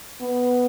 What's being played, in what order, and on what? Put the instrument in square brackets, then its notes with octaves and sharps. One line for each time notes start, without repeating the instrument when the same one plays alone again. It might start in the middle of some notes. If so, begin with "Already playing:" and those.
[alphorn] B3